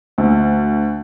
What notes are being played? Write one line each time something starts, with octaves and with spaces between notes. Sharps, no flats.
D2